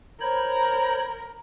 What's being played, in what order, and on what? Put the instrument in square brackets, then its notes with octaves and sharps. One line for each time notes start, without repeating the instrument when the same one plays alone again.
[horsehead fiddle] A#4 [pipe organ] C5 C#5 B5